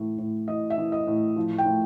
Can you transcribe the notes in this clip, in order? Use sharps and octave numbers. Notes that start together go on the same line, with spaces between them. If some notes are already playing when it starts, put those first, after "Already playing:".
Already playing: A2 E3
A2
E3 D#5
E5
E3
D#5
A2
F3
G5
A2